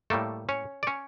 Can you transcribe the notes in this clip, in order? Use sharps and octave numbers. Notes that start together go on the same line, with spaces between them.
A2 G3 A3 A#3 A4
C#4 C#5
D5
C#4 C#5